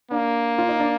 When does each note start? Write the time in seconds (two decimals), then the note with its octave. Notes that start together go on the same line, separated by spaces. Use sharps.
0.11 A#3 D4
0.58 F4
0.69 D#4
0.80 D4